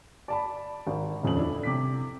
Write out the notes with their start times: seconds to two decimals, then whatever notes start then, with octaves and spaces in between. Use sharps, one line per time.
0.28 D5 A5 B5
0.87 G#1
1.23 D#1 F2 C#4 F#7
1.37 D4 E4 A4
1.63 C3 D6 B6